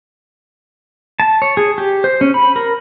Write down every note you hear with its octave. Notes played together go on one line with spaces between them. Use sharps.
A5
C#5
G#4
G4
C5
C#4
B5
A#4